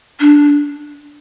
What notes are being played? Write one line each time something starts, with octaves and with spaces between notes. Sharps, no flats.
D4